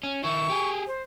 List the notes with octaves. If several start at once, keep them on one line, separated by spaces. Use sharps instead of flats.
C#4
D#3 E4 C#6
G4 G#4
C5